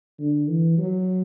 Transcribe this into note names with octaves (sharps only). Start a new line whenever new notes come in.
D3
E3
F#3